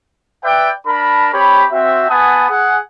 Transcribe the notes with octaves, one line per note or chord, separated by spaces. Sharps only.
B4 D5 E5 G5
D4 A#4 A5 B5
C4 G4 C#5 B5
C4 F#4 E5
B3 F#5 G#5 A5 B5 D#6
G#4 F#5